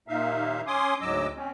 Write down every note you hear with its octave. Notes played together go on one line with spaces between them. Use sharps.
D#2 A#2 A#3 D#4 E5 F5
C#4 G#5 C6 D6 D#6
D2 G#2 F#3 D#5 D6 E6
C4 C#4